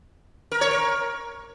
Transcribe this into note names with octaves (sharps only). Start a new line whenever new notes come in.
A#4
C#5
A#4